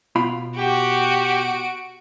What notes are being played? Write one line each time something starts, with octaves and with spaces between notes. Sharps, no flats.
B2 F4 B5
F#4 G4 D7